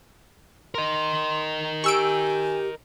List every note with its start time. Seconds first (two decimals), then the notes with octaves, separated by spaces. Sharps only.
0.75 A#4 D#5 C6
1.84 G4 G#5 C#6 E6 D7